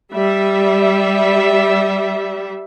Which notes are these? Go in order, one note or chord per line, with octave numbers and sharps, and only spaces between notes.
G3 E5